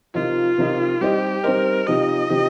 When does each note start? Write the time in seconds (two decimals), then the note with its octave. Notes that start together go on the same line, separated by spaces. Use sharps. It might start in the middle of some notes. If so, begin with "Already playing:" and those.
0.14 C3 F3 D#4 F4 A#4 D#5
0.58 C3 F3 D#4 A#4 D#5
1.01 G3 C4 D#4 G4 C5 D#5
1.44 G3 C4 D#4 A#4 C5 D#5
1.87 C3 F3 D#4 G4 D#5
2.30 C3 F3 D#4 G4